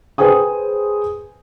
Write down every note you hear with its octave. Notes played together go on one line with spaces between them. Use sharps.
G#4 B4 C5 G5 G#5 D#6